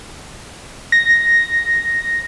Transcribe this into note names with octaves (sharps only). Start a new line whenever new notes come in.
A#6